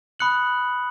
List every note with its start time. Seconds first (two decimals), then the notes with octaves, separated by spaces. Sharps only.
0.19 B5 D#6 F#6 C#7 F#7